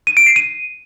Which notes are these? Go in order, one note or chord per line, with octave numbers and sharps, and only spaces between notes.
D#7
D7
C7
D#7